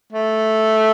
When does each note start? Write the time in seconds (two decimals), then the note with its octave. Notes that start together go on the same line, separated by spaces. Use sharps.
0.12 A3